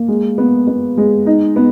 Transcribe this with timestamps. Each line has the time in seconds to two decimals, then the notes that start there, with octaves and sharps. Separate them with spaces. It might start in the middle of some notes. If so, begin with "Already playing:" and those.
Already playing: A#3
0.08 G#3
0.38 B3
0.67 B3
0.98 G#3
1.26 D#4
1.56 B3